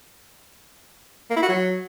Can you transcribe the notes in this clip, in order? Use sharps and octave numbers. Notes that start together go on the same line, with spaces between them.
A#3
E4
F#4
F#3